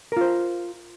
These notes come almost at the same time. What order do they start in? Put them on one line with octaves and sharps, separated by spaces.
A#4 F4 C5